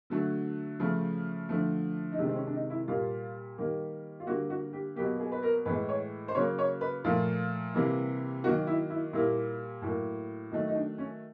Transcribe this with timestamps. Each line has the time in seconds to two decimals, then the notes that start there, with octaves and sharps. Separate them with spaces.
0.10 D3 F#3 A3
0.79 C#3 F3 A3
1.49 D3 F3 A3
2.12 D#4
2.18 C3 D#3 G#3 D4
2.29 C4
2.36 C#4
2.47 D4
2.53 D#4
2.70 E4
2.88 A#2 G3 A#3 F4
3.58 D#3 G3 A#3
4.20 F4
4.27 D3 G3 A#3 F#4
4.50 F#4
4.73 G4
4.96 B2 F#3 A#3 G4
5.20 G#4
5.32 B4
5.43 A#4
5.65 A2 E3 G#3 B4
5.89 C#5
6.28 C5
6.35 C#3 F#3 A#3 C#5
6.59 C#5
6.81 B4
7.04 A#2 F3 A3 F4
7.74 C3 E3 G3 A#3
8.43 D#3 F#3 A#3 F#4
8.67 E4
8.90 E4
9.13 A#2 G3 A#3 E4
9.82 A2 F#3 A#3
10.51 D#3 F#3 A3 D#4
10.68 D#4
10.75 D4
10.98 C#4